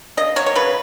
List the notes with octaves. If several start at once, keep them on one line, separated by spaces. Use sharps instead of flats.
C#3 D#5
F#3 C#5
C#5
C#3 B4